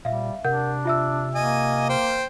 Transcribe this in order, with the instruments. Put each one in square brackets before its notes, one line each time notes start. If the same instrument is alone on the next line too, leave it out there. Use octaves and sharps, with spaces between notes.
[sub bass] A#2 [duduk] G3 [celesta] E5 F5
[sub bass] C3 [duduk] D4 [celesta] A#4 F#5 G6
[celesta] F4 E5 E6
[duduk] A#3 [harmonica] D#5 G#5
[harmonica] C5 G5